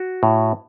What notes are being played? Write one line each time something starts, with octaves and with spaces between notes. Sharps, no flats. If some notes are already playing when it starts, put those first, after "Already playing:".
Already playing: F#4
A2